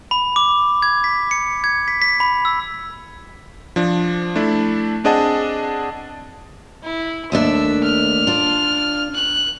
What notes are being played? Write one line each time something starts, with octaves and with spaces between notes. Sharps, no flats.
B5
D6
G#6
B6
C#7
G#6
B6
B6
B5
E6
F3 D4
A3 D4 E4
C4 D4 G#4 D#5 F#5 A5
E4
D#2 A3 D4 E5
F6
D4 F4
F#6